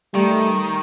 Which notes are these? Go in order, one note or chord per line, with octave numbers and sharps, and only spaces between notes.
D#3 G3 A3